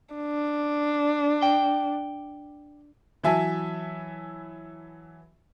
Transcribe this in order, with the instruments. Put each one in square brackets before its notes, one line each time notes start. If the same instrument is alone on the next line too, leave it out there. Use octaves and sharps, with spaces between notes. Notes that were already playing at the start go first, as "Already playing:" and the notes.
[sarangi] D4
[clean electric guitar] G5
[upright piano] E3 F#3 E5 G#5 A5